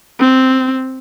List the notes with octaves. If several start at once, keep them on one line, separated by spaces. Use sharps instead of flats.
C4